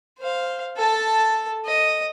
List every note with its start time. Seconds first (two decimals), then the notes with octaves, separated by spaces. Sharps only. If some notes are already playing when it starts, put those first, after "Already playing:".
0.18 C5 F5
0.77 A4 A5
1.65 D#5